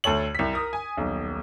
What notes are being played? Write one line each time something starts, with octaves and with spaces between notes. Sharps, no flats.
D2 A4 C#5 F#7
C2 B6
A#4 D#6
G#5
D#1 B1